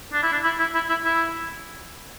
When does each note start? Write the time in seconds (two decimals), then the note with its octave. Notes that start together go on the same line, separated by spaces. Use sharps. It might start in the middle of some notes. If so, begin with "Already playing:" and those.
0.13 D4
0.23 E4
0.32 D4
0.44 E4
0.59 E4
0.74 E4
0.89 E4
1.05 E4